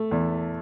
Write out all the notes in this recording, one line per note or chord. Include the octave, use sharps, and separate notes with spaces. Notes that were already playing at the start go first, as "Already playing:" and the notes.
Already playing: A3
E2